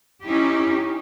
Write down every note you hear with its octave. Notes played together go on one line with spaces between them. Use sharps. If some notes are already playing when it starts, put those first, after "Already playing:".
C#4 D#4 E4 G4